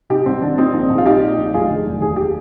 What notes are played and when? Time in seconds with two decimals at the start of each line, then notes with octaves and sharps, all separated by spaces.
0.10 C3 D#4 G4
0.26 C2 C4
0.41 D#3 D4
0.58 A#2 C4 D#4
0.74 A#1
0.90 A#1
0.98 F4
1.06 A#2 D#4 G4
1.22 A#2
1.38 A#1
1.54 F1 F4 G#4
1.70 D3
1.86 F1
2.01 D#2 G#4
2.16 G4